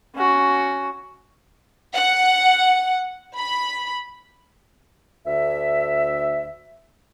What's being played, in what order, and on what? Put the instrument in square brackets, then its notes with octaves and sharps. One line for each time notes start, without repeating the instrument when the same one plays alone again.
[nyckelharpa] C#4 F#4
[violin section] F#5
B5
[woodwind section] D2 E5